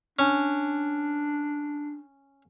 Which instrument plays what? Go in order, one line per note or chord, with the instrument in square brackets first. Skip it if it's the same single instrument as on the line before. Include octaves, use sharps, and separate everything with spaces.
[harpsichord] C#4 [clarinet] D4